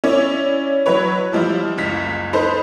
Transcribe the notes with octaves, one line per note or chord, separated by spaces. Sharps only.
C#4 E4 C#5 D5
F#3 E4 B4 C#5
E3 F3 G3 E4 F4
F#1 C#2 B6
D#4 A4 B4 C5